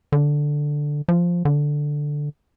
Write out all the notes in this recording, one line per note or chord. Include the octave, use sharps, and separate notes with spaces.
D3
F3
D3